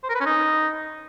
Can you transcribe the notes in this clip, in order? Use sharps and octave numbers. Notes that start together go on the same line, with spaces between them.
C5
A#4
B4
C#4
D#4